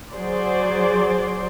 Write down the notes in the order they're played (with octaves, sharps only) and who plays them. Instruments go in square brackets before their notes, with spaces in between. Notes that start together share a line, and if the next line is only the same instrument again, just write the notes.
[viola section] F#3 G#4 C5 D5